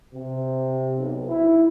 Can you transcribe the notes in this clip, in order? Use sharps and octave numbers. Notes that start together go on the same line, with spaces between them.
C3
B1
E4